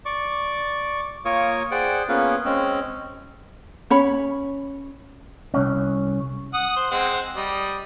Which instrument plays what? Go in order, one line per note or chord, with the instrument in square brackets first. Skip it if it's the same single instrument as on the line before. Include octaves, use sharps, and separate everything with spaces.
[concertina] D5 C#6 D6
A#3 F4 A#4 C#5 C#6 D#6
G#4 C5 D5 F#5 G5
A#3 B3 C#4 F4 G#4 B4
G#3 C4 C#4
[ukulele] C#4 C#5 B5
[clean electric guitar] C2 C#4
[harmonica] F#5 D#6
C5
G#3 C4 F#5
G3 D#5